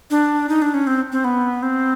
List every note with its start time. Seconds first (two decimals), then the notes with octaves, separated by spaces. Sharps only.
0.10 D4
0.49 D#4
0.62 D4
0.74 C#4
0.87 C4
1.12 C4
1.24 B3
1.62 C4